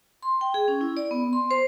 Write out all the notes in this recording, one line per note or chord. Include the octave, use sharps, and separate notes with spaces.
C6
G5
G#4
C#4
E4
D5
B3
C6
C5